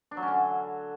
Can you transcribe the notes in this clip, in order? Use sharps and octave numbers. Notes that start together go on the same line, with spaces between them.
D4
F#3
C#4
D3